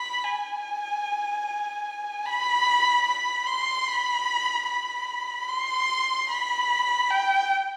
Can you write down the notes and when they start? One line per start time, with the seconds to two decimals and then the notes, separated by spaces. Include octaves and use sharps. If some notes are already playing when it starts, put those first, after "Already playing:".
Already playing: B5
0.24 G#5
2.25 B5
3.07 B5
3.47 C6
3.87 B5
4.67 B5
5.49 C6
6.30 B5
7.10 G5